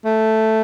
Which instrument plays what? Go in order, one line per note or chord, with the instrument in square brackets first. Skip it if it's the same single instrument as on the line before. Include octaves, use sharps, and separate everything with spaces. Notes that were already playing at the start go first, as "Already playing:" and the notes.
[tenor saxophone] A3